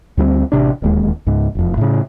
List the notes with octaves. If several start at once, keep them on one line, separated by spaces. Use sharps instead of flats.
D2 G3 A#3 C4
A1 C3 D4
D1 D#2 G#3
C#2 G#2
E1 F2
A2 C#3